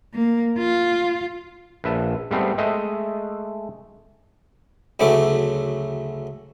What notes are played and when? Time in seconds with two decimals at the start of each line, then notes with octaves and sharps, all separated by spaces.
0.14 A#3
0.58 F4
1.84 A#1 B4 E5 A5
2.31 G#2 G3 A3 B3 C4
2.58 G#3 A3 D#5 E5
5.00 D2 C#3 F#3 A3 E4 D6